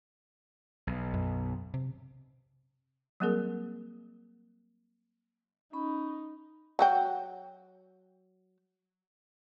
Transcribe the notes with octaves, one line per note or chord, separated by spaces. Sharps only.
B1
F#2
C3
F#3 G3 A#3 C4 G#4 A#4
C#4 D#4 B5
F#3 F#4 G5